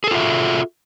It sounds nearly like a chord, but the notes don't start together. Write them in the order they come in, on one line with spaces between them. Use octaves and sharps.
G#4 A4 F4 E5 F#4